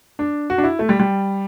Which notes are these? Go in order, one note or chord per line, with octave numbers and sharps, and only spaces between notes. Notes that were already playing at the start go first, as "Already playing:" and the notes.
D4
F#4
D4
E4
A3
G3
G3